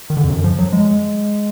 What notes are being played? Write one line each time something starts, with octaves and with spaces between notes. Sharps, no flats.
D#3
D3
F2
F#2
F3
F#3
G#3